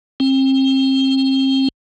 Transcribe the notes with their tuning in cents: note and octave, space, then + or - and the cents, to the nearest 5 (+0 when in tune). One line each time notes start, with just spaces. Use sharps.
C4 +35